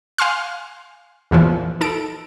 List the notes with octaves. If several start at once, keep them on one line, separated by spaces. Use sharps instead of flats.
F5 G#5 C6 F6
E2 A#2 E3 F3
D#4 A4 D7